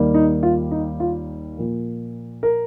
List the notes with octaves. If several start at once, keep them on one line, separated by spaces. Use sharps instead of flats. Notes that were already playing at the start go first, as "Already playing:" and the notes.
Already playing: D#2 D#3 G3 A#3
D#4
F4
D#4
F4
A#2 F3 A#3
A#4